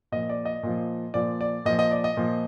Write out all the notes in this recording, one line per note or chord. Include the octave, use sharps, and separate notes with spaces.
A#2 F3 D#5
D5
D#5
A#2 F3
A#2 F3 D5
D5
A#2 F3 D#5
D#5
D5
D#5
A#2 F3